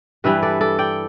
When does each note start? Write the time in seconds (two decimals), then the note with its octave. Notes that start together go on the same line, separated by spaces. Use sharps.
0.24 G2 E3 G3 E4 B4 E5
0.43 A4 D5
0.61 A4 D5
0.79 D5 G5